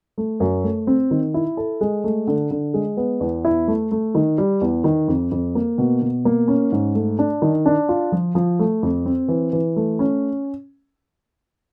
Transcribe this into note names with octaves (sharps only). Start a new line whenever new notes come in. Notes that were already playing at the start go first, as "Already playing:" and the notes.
A3
F#2
A3
C4
D#3
E4
A4
G#3
A3
D3
D3
G#3
B3
E2
E4
A3
A3
D#3
G3
E2
D#3
F2
F2
A#3
B2
B2
A#3
C#4
G#2
A3
D4
D#3
D4
F4
F3
F3
A3
F2
C4
E3
E3
A3
C#4